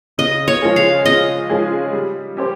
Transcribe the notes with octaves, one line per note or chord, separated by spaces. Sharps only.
C#3 D#5
C#5
F3 G#3 C#4 G#4
F5
C#3 D#5
F3 G#3 C#4 G#4
G3
C#4 G4 C5